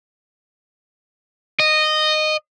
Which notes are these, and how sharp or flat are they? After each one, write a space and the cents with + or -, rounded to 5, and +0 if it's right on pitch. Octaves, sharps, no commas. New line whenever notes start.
D#5 -15